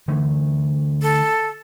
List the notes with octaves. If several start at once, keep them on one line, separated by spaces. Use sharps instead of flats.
D3 E3 A3
A4